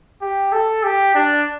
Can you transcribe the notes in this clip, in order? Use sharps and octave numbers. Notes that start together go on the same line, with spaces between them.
G4
A4
G4
D4